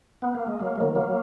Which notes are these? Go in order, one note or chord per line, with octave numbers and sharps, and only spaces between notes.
B3
A#3
G#3
F#3 A#3
G#3
D#3 F#3
F#3 A#3